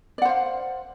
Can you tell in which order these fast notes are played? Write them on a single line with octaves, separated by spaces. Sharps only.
D5 F#5 C5 F5